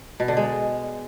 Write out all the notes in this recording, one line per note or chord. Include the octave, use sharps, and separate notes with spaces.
B2
D3
G#3